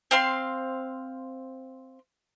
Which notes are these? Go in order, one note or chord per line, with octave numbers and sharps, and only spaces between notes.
C4 F5 C6